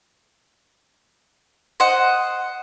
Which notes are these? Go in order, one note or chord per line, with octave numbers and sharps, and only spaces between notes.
C5 D#5 F#5